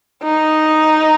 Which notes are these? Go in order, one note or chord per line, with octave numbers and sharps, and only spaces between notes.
D#4